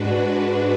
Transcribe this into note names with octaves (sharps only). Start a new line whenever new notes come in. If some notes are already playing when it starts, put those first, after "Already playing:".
Already playing: G#2 G#3 D4 F#4 B4